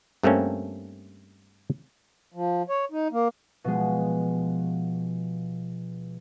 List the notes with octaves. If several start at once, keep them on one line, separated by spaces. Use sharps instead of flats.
G2 A3 A#3 C4 C#4
F3
C#5
D#4
A#3
B2 F3 G#3